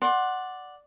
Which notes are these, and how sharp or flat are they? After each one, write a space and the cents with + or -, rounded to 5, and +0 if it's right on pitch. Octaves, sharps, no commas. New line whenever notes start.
D5 +0 F#5 +0 C6 +25